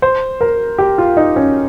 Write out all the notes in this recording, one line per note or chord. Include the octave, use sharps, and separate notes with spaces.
C5
A#4
G4
F4
D#4
C#4